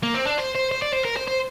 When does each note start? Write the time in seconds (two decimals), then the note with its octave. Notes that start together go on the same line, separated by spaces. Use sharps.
0.03 A#3
0.14 C4
0.26 D4
0.38 C5
0.55 C5
0.71 C5
0.82 D5
0.93 C5
1.05 A#4
1.17 C5
1.28 C5